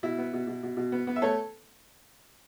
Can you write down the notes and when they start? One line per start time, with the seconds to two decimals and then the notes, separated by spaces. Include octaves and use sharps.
0.03 B2 E4
0.18 B3
0.33 B2
0.47 B2
0.63 B2
0.77 B2
0.92 B3
1.07 B3
1.16 E5
1.22 A3 A4 C#5